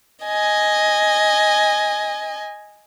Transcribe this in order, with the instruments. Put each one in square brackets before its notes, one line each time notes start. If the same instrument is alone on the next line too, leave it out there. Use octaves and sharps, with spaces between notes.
[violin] D#5 G#5